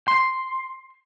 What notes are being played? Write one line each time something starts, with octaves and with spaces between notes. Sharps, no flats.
C6